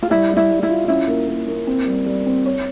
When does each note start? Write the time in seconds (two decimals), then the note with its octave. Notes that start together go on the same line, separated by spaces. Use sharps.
0.03 F4
0.10 G3 E4
0.29 G3
0.37 E4
0.50 G3
0.63 E4
0.69 F4
0.88 C#4 E4
1.08 A#3
1.28 A#3
1.48 A#3
1.67 C4
1.86 G3
2.06 G3
2.26 C4
2.46 C#5